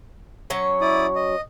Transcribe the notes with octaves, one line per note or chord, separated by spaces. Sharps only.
F#3 C#4 C#5
E4 D5 D#6
D#5